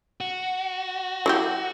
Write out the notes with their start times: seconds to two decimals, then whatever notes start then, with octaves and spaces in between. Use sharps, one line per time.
0.21 F#4
1.26 F#3 E4 G4